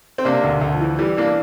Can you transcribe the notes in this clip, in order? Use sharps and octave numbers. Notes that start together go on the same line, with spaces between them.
C4
C3 A#3 D4
D2
D2
F3
E3
E3 G3
E3 A#3 D4